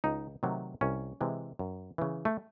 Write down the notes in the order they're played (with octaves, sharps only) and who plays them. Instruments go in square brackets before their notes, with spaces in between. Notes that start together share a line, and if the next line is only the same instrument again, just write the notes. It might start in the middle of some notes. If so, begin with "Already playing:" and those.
[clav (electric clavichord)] C#2 D#4
C3 D#3 F#3 A3
C2 C#4
C3 E3 G#3
F#2
C#3 E3
A3